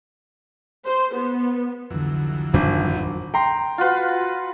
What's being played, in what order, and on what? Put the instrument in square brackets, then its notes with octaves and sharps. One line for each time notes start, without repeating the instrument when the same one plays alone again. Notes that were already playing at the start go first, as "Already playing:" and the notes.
[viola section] C5
B3
[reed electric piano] C2 D3 [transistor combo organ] F2 E3 F#3
[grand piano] D#1 G#1 [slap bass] F#2 D4
[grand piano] G5 A#5 C6
[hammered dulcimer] F4 F#4 B4